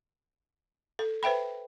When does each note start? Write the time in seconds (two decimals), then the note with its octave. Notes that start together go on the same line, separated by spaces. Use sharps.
0.99 A4
1.23 B4 C5 E5 G5 B5